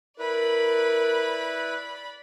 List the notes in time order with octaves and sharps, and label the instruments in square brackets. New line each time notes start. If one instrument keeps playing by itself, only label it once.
[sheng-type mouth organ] E4 B4 [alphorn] A#4 [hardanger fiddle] D5 B5